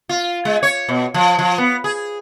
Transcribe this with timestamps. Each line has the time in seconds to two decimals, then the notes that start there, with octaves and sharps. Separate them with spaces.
0.09 F4
0.45 G#3
0.63 C#5
0.89 B2
1.14 F3
1.39 F3
1.58 B3
1.84 G#4